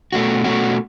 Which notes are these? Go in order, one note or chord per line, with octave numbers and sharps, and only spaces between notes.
B2 A3 C#4 F#4
B2 A3 C#4 F#4